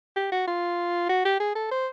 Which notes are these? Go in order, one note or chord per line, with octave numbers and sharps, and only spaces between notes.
G4
F#4
F4
F#4
G4
G#4
A4
C5